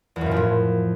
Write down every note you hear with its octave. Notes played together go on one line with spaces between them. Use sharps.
E2
F#2
A#2
F2
A2